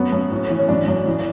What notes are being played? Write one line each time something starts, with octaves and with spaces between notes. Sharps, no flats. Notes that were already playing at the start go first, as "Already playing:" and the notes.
Already playing: F#2 B3
F#2
A2
E3
C#4
F#2 D4
F#2
E3